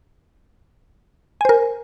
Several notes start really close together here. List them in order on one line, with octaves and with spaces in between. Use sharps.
G#5 C5 A#4